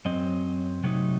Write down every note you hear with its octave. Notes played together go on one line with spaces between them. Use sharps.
F#2 F#3 C4 D#5
C3 F#3 A3 D#4